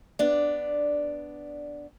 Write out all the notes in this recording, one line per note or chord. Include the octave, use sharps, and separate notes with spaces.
B3 D4 D5